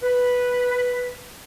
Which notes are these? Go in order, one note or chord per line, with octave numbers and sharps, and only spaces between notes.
B4